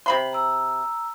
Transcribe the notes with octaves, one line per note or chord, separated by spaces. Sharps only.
C3 B5 C6
A#5 E6